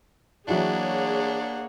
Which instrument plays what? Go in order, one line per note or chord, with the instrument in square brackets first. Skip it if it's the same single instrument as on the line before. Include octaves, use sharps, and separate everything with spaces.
[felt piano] E3 F#3 [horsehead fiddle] A#3 F#5 [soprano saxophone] D4 [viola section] G#4 C#5